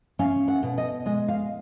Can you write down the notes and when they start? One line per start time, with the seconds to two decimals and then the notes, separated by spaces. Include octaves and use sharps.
0.19 C#4 F5
0.48 F#5
0.63 B2
0.78 D#5
1.06 G#3 D#5
1.28 F5